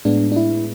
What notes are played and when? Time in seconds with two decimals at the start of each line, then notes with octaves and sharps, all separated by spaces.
0.05 A2 G#3 B3 D4
0.32 D4
0.36 E4